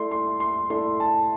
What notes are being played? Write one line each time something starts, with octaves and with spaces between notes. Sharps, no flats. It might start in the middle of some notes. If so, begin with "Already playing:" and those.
Already playing: A3 E4 A4 D5 C6
C6
C6
A3 E4 A4 D5 C6
A5